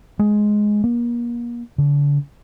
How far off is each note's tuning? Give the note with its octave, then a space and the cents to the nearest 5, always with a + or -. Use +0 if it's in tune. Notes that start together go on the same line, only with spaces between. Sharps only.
G#3 +5
A#3 +35
D3 -35